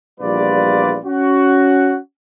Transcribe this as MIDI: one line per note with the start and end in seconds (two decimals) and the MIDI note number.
0.20 0.98 34
0.20 0.98 40
0.20 0.98 55
0.20 0.98 65
0.20 0.98 71
0.20 0.98 74
1.04 1.98 61
1.04 1.98 66